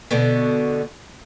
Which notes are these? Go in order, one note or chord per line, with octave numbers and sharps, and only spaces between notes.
B2 D3 B3